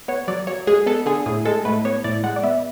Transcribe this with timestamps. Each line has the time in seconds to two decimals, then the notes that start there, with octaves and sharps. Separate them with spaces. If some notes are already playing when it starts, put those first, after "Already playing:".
0.08 B3 C#5
0.28 F#3 D5
0.47 F#3 C#5
0.67 G#3 G#4
0.86 B3 A4
1.06 D3 G#4
1.26 A2 G#4
1.45 G#3 A4
1.65 A2 B4
1.85 B3 C#5
2.04 A2 D5
2.24 G#3 F#5
2.36 D5
2.43 B3 E5